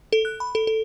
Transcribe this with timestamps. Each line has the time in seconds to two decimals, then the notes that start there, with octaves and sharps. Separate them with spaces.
0.13 A4
0.25 F#6
0.40 B5
0.55 A4
0.67 A4